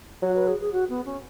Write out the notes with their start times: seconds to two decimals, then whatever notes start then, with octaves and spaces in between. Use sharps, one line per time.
0.22 F#3 F#4
0.35 B4
0.47 G#4
0.60 G#4
0.72 F#4
0.89 B3
1.05 C#4